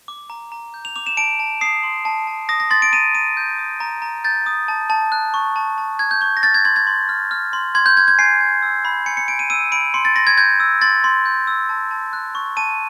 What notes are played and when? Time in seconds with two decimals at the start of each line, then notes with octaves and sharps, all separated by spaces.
0.08 D6
0.30 A#5
0.52 A#5
0.74 G6
0.85 F7
0.96 D6 F7
1.06 E7
1.17 A5 D7
1.40 A5
1.61 D#6 C7
1.83 C6
2.05 A5
2.27 A5
2.49 D#6 A#6
2.60 A#6
2.70 C6 A6
2.82 D7
2.92 A#5 D#7
3.14 A#5 D#7
3.37 G6
3.58 D#6
3.80 A#5
4.02 A#5
4.24 G6 A6
4.46 D#6
4.68 A5
4.90 A5
5.12 F#6
5.34 C#6
5.56 A5
5.78 A5
5.99 F#6 G#6
6.11 G6
6.21 C#6 G6
6.37 A#6
6.43 F6 A6
6.54 G#6
6.65 C6 G#6
6.76 G#6
6.87 C6
7.09 F6
7.31 F6
7.53 C6
7.75 C6 G#6
7.86 G6
7.97 F6 G#6
8.08 G#6
8.18 G#5 C7
8.41 G#5
8.62 E6
8.85 B5
9.06 G#5 C#7
9.17 C#7
9.28 G#5 D7
9.39 D#7
9.50 E6 D#7
9.72 B5 D7
9.94 C6 C#7
10.05 A6
10.16 C6 A#6
10.27 G#6
10.38 G6 G#6
10.60 E6
10.81 C6 A6
11.04 C6
11.25 G6
11.47 E6
11.69 A5
11.91 A5
12.13 F#6
12.35 C#6
12.57 A5 D#7